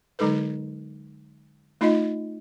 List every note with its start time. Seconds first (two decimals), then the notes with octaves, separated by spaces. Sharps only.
0.19 D3 F#3 G#3 D#4 A4 B4
1.81 A3 D#4 F4 D#5